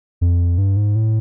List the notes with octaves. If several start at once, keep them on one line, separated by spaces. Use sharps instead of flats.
F2
G2
G#2
A2